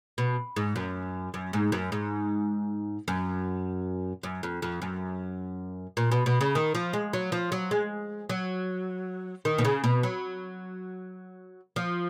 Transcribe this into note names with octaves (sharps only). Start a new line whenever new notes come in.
B2
G#2
F#2
F#2
G#2
F#2
G#2
F#2
F#2
F2
F2
F#2
A#2
B2
B2
C#3
D#3
F3
G#3
F#3
F3
F#3
G#3
F#3
D#3
B2
C#3
B2
F#3
F3